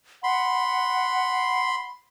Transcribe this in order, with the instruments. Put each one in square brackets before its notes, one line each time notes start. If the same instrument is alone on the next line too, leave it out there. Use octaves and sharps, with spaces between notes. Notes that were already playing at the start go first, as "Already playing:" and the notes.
[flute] F#5 [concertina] B5 C6